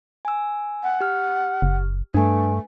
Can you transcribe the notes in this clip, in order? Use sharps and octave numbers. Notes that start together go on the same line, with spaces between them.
G#5 E6
F#5
G4 F6
F#1
G2 A3 D4 B4 G#5